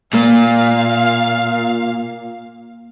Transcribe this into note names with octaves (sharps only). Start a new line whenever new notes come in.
A#2 A#3 F5